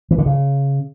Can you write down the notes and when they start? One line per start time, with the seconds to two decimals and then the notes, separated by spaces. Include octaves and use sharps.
0.11 E3
0.18 D3
0.26 C#3